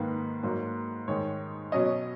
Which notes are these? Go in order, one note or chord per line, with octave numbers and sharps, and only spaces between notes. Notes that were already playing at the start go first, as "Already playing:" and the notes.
Already playing: G#2 D#3 A#3 B4
G#2 F#3 A#3
G#2 D#3 G#3 C#5
B2 F#3 C#4 D#5